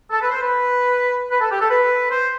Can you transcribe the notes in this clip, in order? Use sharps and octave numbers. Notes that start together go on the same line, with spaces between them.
A4
B4
C5
B4
B4
A4
G4
A4
B4
C5